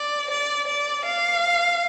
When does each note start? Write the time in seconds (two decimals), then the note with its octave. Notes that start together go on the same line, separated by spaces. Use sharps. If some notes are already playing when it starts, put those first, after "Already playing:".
Already playing: D5
0.30 D5
0.68 D5
1.06 F5